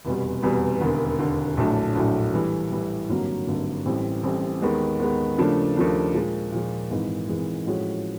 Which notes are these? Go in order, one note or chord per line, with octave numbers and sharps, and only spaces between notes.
F1 E2 B2 G3
F1 E2 B2 G3
E1 D#2 D3
E1 D#2 D3
A#1 A2 F#3 A3 D4
A#1 A2 F#3 A3 D4
A2 E3 G3
A2 E3 G3
G#1 G2 D3 F#3 A#3
G#1 G2 D3 F#3 A#3
A1 A2 E3 G3 C4
A1 A2 E3 G3 C4
D#2 D#3 G#3 B3
D#2 D#3 G#3 B3
D#2 C#3 F3 A3 D4
D#2 C#3 F3 A3 D4
A#2 F3 G#3
A#2 F3 G#3
G#1 G#2 E3 G#3
G#1 G#2 E3 G#3
A2 F3 G#3 C#4 F#4